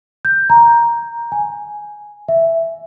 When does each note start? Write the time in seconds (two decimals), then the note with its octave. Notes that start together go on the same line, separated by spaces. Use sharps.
0.25 G6
0.50 A#5
1.32 G#5
2.28 E5